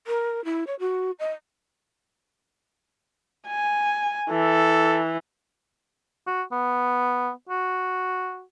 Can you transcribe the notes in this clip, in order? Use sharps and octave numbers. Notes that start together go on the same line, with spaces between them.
A#4
E4
C#5
F#4
D#5
G#5
E3 A4
F#4
B3
F#4